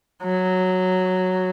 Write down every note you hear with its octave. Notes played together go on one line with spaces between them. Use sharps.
F#3